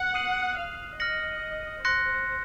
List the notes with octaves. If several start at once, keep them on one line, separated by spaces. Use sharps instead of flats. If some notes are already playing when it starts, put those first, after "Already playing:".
Already playing: F#5
D#6 F#6 C7 D#7 F#7
F5
D#5 F6 A#6 C#7 F#7
C5 C6 F#6 A#6 C#7